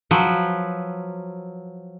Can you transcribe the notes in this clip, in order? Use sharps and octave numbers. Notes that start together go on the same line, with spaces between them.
F3 F#3 B4